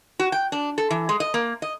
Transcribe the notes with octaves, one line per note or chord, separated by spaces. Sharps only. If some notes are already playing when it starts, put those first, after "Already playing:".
F#4
G5
D4
A4
E3
G#3
D#5
A#3
D#5